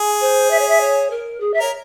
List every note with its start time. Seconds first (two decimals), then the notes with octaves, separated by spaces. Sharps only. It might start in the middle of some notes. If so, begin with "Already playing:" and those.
Already playing: G#4
0.21 C5
0.51 E5
0.59 C#5
0.68 E5
0.80 C#5
1.10 A#4
1.40 G#4
1.54 E5
1.60 A#4 C#5